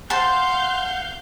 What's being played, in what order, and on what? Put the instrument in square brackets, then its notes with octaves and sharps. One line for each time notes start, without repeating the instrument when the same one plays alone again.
[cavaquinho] C5 A5 [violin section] F5 G6 [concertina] F#5